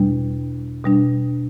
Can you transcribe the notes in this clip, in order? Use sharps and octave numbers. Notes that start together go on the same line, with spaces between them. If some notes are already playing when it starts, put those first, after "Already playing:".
Already playing: E2 B2 G3 D4
B2 G3 D4